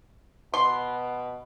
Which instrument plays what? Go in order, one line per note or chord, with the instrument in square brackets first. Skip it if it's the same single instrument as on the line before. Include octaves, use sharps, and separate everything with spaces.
[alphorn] B2 [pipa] C6